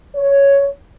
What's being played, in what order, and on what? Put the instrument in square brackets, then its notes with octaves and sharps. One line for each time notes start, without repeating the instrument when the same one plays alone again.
[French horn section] C#5